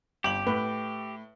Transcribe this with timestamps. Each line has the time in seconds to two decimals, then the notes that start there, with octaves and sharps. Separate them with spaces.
0.24 G1 G4 D6 F#7
0.47 A2 B4